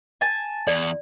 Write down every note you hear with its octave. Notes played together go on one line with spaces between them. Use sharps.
G#5 A5
E2 D5